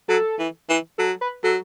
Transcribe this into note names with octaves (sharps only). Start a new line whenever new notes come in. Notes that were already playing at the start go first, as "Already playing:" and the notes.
F#3 A4
E3
E3
F#3 A4
B4
F#3 A4